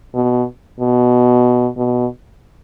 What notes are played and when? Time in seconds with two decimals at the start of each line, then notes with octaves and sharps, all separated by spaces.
0.15 B2
0.80 B2
1.77 B2